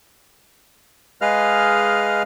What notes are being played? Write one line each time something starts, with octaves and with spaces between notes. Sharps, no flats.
G#3 G#4 B4 D#5 F5 F6